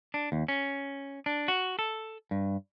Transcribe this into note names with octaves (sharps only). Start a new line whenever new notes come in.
D4
D#2
C#4
D4
F#4
A4
G2